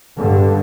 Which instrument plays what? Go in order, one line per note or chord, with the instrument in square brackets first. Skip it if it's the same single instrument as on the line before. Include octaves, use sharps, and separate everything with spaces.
[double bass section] G2 D3